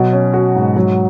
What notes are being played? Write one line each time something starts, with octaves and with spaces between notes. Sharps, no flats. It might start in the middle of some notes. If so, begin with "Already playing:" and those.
Already playing: B2 F#3
C#4
F#4
G#2
F#3